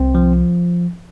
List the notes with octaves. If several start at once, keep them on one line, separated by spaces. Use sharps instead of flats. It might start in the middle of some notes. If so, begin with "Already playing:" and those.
Already playing: C2 C4
F3